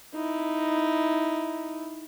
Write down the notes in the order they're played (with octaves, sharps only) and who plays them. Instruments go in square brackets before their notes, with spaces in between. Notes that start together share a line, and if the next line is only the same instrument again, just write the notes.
[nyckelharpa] D#4 E4